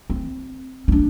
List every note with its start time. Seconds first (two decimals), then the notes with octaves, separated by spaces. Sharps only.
0.10 C4
0.88 C#4
0.92 D4